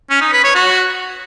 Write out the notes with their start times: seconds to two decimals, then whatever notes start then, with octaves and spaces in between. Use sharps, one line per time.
0.10 C#4
0.21 D#4
0.33 B4
0.44 C#5
0.55 F#4